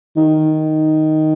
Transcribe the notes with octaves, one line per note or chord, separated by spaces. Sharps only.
D#3